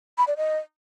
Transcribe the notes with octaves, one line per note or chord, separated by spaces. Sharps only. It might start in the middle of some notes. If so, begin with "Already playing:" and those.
B5
D5
D#5